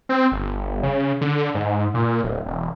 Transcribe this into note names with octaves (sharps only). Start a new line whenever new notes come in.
C4
G1
C#3
D3
G#2
A#2
D1
E1